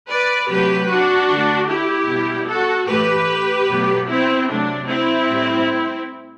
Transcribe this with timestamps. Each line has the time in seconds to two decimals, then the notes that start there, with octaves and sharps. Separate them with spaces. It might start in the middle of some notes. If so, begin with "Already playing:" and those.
0.10 B4 D5
0.49 C3 F#3 A3 G4 B4
0.89 D4 F#4
1.30 D3 A3
1.69 E4 G4
2.10 B2 G3
2.49 F#4 A4
2.88 A2 E3 A3 G4 B4
3.69 B2 F#3 A3
4.08 C4 E4
4.48 C3 F#3 A3 D4
4.88 C4 E4
5.28 A2 G3